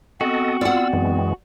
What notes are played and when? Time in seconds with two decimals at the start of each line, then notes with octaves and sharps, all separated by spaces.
0.21 B3 C4 F#4 A4 D#5
0.61 F4 D5 F#5 E6
0.93 F#2 E3 G#3